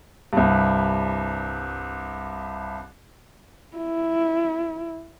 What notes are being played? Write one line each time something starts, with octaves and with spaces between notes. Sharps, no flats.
C2 G2
E4